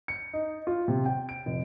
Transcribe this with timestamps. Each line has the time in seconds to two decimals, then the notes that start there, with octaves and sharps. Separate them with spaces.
0.08 C#7
0.33 D#4
0.67 F4
0.88 C3
1.06 G5
1.29 D7
1.46 F1